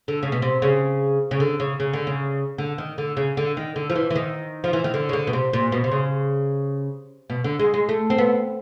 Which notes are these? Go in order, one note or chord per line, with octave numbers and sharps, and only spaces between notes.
D3
C#3
B2
C3
C#3
C#3
D3
C#3
C#3
D3
C#3
D3
D#3
D3
C#3
D3
D#3
D3
F3
E3
E3
D#3
F3
E3
D#3
D3
C#3
D3
B2
C3
A#2
B2
C3
C#3
B2
D3
G#3
G#3
A3
C4
B3